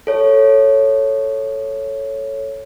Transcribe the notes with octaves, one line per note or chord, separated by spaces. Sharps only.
A4 C#5